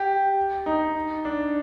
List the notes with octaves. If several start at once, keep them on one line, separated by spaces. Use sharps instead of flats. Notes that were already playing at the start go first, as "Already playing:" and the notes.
Already playing: G4
D#4
D4